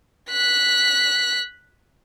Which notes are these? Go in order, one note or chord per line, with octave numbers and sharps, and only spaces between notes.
F#6 B6